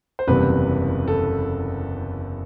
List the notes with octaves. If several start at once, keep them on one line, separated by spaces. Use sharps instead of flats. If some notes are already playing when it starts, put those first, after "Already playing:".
C5
F#1 E2 C3 G3 B4
A4